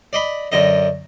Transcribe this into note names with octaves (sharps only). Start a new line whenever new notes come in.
D5 D#5 B5
F#2 D3 D#5